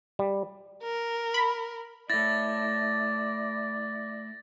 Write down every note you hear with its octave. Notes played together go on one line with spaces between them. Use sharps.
G3
A#4
B5
A3 E4 D5 A6 A#6